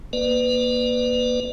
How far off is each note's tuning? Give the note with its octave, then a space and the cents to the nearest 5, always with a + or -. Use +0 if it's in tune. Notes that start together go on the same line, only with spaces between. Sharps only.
A#3 +30 B4 +25 D5 +25